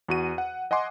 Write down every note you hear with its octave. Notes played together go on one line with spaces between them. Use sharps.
E2 F#4 D#7
F#5
D#5 F#5 G#5 C6 D6